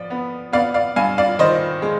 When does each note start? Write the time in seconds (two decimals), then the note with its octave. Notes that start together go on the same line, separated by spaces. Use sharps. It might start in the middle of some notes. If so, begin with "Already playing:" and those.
Already playing: F3 D5
0.10 B3
0.53 B3 D5 F5
0.74 D5 F5
0.96 G2 F5 G#5
1.18 D5 F5
1.39 D#3 C5 D#5
1.82 G#3